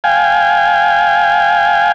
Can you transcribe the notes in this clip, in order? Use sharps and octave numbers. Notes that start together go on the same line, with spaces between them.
F5 G5 G#5